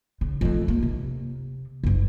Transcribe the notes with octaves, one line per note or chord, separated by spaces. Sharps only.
C#3
F2 A3
A#3
C3
F#1 G2